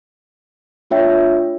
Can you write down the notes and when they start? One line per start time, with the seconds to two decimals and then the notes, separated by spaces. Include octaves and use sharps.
0.90 A3 D4 F4 C#5 E5 G5